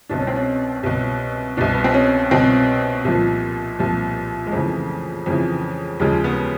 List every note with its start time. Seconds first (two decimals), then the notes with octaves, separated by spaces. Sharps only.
0.09 C2 B2 D4
0.19 C#4
0.27 C4
0.36 C#4
0.83 C2 B2
1.57 C2 B2 D4
1.74 B3
1.84 C4
1.94 C#4
2.31 C2 B2 C4
3.05 C2 A#2 F3
3.79 C2 A#2 F3
4.47 G#3
4.52 F2 C#3 E3 A3
5.26 F2 C#3 E3
6.00 D#2 C#3 F3 G#3
6.24 B3